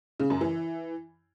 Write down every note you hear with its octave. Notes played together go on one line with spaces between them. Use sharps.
C#3
F#2
E3